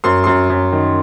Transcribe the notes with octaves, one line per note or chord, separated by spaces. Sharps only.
F#2 C6
F#2 C6
F#2
D#3